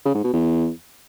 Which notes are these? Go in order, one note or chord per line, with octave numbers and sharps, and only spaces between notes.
C#3
G#2
B2
E2